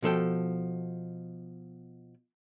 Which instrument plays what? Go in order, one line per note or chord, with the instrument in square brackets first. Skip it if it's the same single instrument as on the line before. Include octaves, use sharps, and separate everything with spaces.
[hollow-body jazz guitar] B2 F3 A4 G5